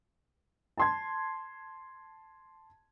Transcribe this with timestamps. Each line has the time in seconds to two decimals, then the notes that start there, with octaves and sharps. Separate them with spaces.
0.78 A5 C6 G#6